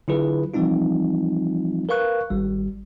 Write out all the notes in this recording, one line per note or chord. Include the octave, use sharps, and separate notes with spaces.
D3 F#3 E4 F4 G#4 B4
E3 F3 G3 C4 D#4 F4
A#4 B4 F5 C#6 F#6
G#1 G3